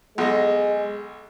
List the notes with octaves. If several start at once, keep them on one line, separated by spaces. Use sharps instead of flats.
B1 G#3 D#5